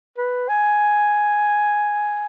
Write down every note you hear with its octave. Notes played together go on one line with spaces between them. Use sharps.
B4
G#5